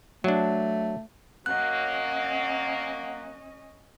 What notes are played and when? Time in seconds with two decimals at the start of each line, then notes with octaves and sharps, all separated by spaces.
0.24 F#3 A3 D4
1.46 F#3 A#3 C#4 D#5 F#5 F#6